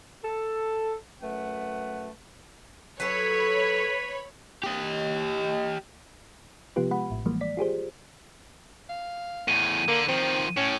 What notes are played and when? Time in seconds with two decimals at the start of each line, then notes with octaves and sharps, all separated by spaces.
0.23 A4
1.21 F#2 A3 B4 F#5
3.00 F#3 A4 B4 C#5 B5
4.63 G4 D#5
6.76 C3 F3 B3 F4 G4 B4
6.91 G#3 F#5 B5
7.10 A1 A2
7.26 E3 F3 G3 G#3 A#3
7.41 D5 B6
7.57 F4 G4 G#4 C5
8.90 F5
9.48 E2 A2 D#7
9.88 D3 A#3
10.09 D#3 F3 C4
10.57 A2 C#4